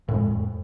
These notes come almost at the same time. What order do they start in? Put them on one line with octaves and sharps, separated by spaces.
A2 F2 G#3